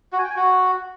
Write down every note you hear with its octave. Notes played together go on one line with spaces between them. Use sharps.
F#4
G#5
G5
G#5
F#4